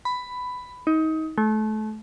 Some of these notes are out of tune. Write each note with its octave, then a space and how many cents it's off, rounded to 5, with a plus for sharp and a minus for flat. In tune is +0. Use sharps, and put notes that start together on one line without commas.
B5 +10
D#4 +25
A3 -30